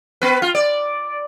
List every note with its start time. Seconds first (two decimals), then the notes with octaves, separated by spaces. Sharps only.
0.22 B3 B4
0.42 F4
0.55 D5